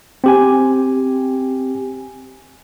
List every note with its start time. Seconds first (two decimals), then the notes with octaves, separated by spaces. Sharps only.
0.24 C4 G4 G#5